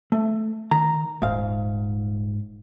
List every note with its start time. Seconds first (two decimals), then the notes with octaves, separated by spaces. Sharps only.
0.12 A3
0.71 D#3 A#5
1.22 D#1 G#2 F5